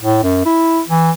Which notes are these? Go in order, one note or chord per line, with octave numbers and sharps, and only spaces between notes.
A2
F#2
E4
E3